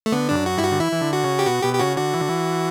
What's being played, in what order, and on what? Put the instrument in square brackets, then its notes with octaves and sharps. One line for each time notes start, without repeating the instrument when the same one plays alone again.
[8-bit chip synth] A3
[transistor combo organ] D3 [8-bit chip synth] B3
[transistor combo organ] G2 [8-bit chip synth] D4
[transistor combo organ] F#2
[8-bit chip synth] F#4
[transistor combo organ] G2 [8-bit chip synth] E4
[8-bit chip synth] F#4
[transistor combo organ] D3
[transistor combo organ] E3 [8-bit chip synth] E4
[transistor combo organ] E3
D3
[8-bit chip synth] F#4
[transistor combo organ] C#3
[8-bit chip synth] G4
[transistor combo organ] B2 [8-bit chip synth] F#4
[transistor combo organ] B2 [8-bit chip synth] G4
[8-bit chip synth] G4
[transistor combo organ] C#3 [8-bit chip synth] F#4
[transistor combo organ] D3 [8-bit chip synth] F#4
[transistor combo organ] E3
D3
E3